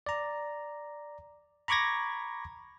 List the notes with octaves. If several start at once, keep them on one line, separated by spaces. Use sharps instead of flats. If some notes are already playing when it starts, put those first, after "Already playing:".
D5 A#5
A#5 B5 C#6 D6 G#6 A#6